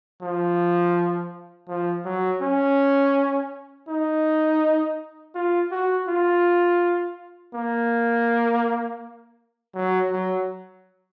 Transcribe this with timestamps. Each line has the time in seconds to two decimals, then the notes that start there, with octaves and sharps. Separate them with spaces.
0.22 F3
1.68 F3
2.05 F#3
2.42 C#4
3.88 D#4
5.35 F4
5.71 F#4
6.08 F4
7.54 A#3
9.74 F#3
10.11 F#3